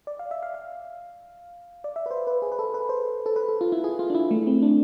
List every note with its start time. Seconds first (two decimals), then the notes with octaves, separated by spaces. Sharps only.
0.07 D5
0.19 F5
0.31 E5
0.43 F5
0.54 F5
1.84 D5
1.96 E5
2.06 B4
2.11 C5
2.27 B4
2.42 G#4
2.52 B4
2.59 A4
2.74 B4
2.89 C5
3.26 A4
3.36 B4
3.48 A4
3.61 F4
3.72 E4
3.84 G#4
3.99 F4
4.10 D4
4.15 E4
4.31 A3
4.47 C4
4.62 D4